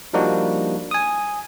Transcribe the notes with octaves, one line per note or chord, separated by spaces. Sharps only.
F3 G3 A#3 D4 D#4 F#4
G#5 D#6